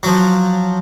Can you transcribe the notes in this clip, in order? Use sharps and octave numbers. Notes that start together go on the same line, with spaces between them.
F3 F#3